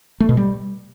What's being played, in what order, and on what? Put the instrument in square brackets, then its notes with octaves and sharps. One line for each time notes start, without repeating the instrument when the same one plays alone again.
[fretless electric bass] A3
B2
G3